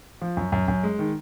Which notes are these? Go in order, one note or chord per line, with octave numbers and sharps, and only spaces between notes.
F3
F#2
F#2
F#2
G#3
D#3